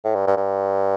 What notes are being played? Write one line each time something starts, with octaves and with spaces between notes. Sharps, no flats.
A2
G2
G2
G2